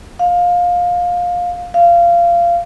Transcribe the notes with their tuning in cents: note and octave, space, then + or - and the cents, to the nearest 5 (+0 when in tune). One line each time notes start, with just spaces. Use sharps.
F5 +20
F5 -20